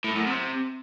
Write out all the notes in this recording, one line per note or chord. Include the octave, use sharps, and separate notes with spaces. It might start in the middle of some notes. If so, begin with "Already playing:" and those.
A2
F#2
C3